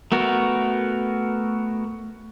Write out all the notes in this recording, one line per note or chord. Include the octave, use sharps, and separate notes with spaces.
A3 B3 F#4 A#4